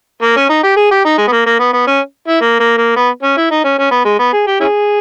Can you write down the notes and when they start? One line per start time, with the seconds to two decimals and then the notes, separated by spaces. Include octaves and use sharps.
0.22 A#3
0.36 C#4
0.50 D#4
0.64 G4
0.77 G#4
0.91 G4
1.05 D#4
1.18 G#3
1.28 B3
1.32 A#3
1.46 A#3
1.60 B3
1.73 B3
1.87 C#4
2.28 E4
2.41 A#3
2.60 A#3
2.78 A#3
2.96 B3
3.23 C#4
3.37 E4
3.51 D#4
3.64 C#4
3.79 C#4
3.91 B3
4.05 G#3
4.19 B3
4.33 G#4
4.47 G4
4.60 C#4 E4 G#4